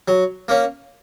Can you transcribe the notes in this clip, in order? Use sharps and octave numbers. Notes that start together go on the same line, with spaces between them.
F#3
A#3 C#4